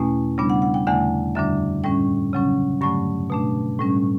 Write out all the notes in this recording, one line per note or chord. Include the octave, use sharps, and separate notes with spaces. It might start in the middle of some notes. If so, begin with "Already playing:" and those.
Already playing: E2 B2 A3 C#4
C#3 G3 B3 D4
F#5
F#5
G5
E2 D3 A3 F#5
F#2 D3 G3 D4 E5
A2 G3 C#4 G5
C#3 F#3 C#4
G2 D3 F#3 A3 C#6
B2 A3 D4
A2 G3 C#4